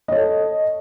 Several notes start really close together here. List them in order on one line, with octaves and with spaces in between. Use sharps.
D#5 C#5 A4